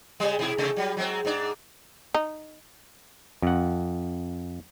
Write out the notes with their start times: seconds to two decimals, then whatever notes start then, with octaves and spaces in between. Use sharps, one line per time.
0.20 C#3 G3
0.39 B2 E4 G#4
0.58 C3 A3
0.76 F#3 G3
0.97 F#3 G#3 C4
1.25 G#2 D4
2.14 D#4
3.42 F2 F#5